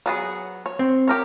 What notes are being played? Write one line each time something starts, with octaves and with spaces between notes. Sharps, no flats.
F#3 B3 G#4
C#5
C4
G4 A#4 C#5